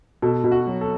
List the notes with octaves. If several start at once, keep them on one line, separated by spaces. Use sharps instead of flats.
B2 A4
B2
F#4
F#3
A4